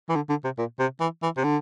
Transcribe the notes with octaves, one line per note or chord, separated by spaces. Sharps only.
E3
D3
D3
C3
A#2
C3
E3
E3
C3
D3